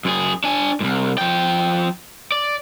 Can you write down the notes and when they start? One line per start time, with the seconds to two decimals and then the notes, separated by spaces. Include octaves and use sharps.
0.05 F#2 G#4
0.44 D4 G#5
0.81 C2 G#2
1.18 F3 G5
2.32 D5